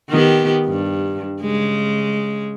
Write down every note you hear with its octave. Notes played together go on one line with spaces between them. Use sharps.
D#3 B3 G4
G2
C#3 G#3